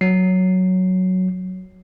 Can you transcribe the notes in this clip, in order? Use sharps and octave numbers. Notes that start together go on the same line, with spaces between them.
F#3 C7